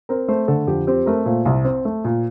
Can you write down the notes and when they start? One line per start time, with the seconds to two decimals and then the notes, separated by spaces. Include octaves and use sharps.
0.09 C4 A#4
0.28 A3 C5
0.48 D3 A4
0.67 F2 G4
0.87 C4 G4
1.06 A3 A#4
1.26 A#2 C5
1.45 C2
1.65 C4
1.85 A3
2.04 A#2